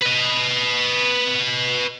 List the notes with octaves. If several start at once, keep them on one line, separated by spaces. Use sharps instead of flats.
B4 D#5